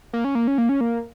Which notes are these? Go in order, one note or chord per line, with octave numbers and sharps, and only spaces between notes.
A#3
C#4
A#3
C#4
A#3
C#4
A#3